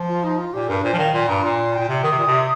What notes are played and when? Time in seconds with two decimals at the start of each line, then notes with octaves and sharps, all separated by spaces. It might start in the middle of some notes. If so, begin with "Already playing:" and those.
Already playing: F3
0.09 F4
0.23 D#4
0.38 F4
0.54 A#2 G4
0.68 G2 A#4
0.83 A#2 C5
0.93 F3
0.99 D#3 F5
1.14 A#2 C6
1.28 G2 A#5
1.43 A#2 C6
1.59 C6
1.73 G5
1.79 A#2
1.88 C3
2.03 D#3 D#6
2.12 C3
2.19 A#2
2.27 C3